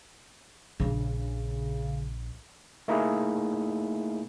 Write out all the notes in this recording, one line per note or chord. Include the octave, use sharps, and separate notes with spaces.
A#1 C#3 D4
A3 A#3 D#4 E4 G#4